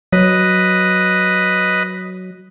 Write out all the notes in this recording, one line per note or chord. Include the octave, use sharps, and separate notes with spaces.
F#3 B4 D#5